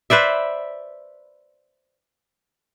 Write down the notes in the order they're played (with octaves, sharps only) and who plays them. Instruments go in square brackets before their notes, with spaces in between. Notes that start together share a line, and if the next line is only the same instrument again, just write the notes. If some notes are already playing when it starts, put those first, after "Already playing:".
[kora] B4 C5 D5 E5